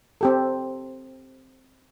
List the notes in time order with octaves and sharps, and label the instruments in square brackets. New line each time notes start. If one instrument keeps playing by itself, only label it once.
[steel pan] C4 G4 A4